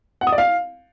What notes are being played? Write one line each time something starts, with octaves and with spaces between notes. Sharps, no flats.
F#5
D#6
D5
F5